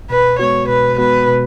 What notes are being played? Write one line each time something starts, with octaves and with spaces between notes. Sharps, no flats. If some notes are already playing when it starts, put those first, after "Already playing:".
B2 B4
G#3 B3 F#4 C#5
B2 B4
G#3 B3 F#4 B4
B2